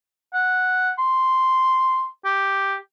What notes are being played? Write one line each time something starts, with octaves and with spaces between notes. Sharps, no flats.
F#5
C6
G4